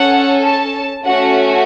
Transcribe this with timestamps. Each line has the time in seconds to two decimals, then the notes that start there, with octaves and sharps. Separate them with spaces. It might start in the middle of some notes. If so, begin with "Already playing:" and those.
Already playing: C#4 A4 F#5
0.43 A5
1.06 A3 C#4 F#4 F#5